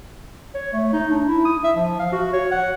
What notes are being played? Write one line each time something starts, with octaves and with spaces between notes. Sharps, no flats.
C#5
A3
D#4
D4
E4
D#6
E5
F3
F5
F#4
C#5
F#5